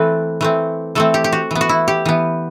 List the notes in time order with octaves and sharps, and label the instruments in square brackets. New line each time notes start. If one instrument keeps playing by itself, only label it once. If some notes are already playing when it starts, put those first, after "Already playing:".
Already playing: [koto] E3 A3 C4 A4 B4
E3 A3 C4
E3 A3 C4 A4
G4
G4
F#4
E3 B3
F#4
E4
G4
E3 B3